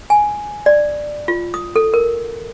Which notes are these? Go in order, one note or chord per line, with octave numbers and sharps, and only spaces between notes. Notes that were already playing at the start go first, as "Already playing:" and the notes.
G#5
D5
F4
D#6
A4
A#4